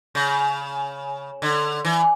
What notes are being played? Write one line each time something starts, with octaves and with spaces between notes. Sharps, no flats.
C#3
D3
E3